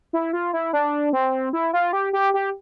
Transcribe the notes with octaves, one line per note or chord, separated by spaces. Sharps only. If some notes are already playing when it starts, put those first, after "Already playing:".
E4
F4
E4
D4
C4
E4
F4
G4
G4
G4